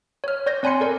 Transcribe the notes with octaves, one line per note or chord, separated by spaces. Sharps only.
C#5 F6
C#5 D5 G6 A#6
C4 D5 G#5 B5 C6 C#7
A4 A#4 D5